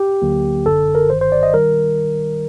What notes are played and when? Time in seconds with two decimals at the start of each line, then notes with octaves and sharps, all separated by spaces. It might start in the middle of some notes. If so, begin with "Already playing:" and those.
Already playing: G4
0.22 D2 D3 F#3 A#3
0.65 G1 F#2 D3 A4
0.95 A#4
1.10 G1 G2 D#3 C5
1.21 C5
1.32 D5
1.43 D#5
1.54 D#3 G3 A#4